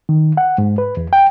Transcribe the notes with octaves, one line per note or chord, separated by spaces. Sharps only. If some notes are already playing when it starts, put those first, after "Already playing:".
D#3
F#5
G#2
B4
E2
G5